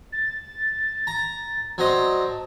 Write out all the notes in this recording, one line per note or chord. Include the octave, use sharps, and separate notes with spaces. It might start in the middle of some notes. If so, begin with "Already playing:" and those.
A6
A#5
F#3 C4 D5 D#5
A5